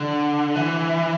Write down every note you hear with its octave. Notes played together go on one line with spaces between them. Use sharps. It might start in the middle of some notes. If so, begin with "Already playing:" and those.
Already playing: D3
E3